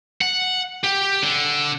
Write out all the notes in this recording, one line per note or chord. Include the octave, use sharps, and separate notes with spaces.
F#5
G4
D3